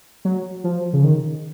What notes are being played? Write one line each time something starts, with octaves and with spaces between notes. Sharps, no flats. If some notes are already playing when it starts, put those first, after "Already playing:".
F#3
F3
C#3
D#3